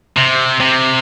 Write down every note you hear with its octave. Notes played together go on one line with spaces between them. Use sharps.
C3
C3